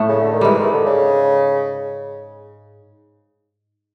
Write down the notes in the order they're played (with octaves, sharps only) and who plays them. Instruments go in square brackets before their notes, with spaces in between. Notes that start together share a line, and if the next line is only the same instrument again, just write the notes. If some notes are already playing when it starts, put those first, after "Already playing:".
Already playing: [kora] A2 A3
[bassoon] C#3
D3
D#3
[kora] G#2 G3 G#3 [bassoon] E3
[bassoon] D#3
D3
C#3